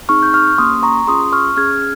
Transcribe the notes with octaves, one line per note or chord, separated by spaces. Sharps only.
C4 D#4 G#4 C#6 F6
G6
C#6 F6
A#3 C#4 G4 C6 D#6
A#5 C#6
C#4 F4 G#4 C6 D#6
C#6 F6
C#4 G#4 F6 G#6